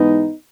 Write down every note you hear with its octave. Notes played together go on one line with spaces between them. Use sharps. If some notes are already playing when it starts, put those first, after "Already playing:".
Already playing: G#2 E3 G#3 B3 D#4